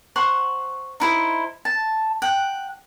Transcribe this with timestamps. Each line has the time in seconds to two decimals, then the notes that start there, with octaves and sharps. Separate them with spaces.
0.16 C5 F#5 C6 C#6
1.00 D#4 E4 C5
1.65 A5
2.22 F#5 G5